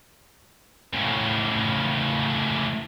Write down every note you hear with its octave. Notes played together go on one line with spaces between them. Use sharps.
A2 C#3